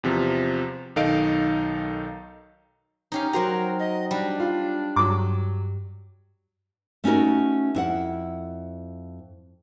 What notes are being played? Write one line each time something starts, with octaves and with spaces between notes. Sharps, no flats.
E2 C3 F3
B1 D#3 D#4 A4 F5 D7
C#4 D#4 G4 F5
F#3 F#4 A#4 C5 G5 A#5
D#5
G3 D4
F4
G2 F#3 D6
A3 C#4 D#4 F#4 A#4
F2 E4 F#5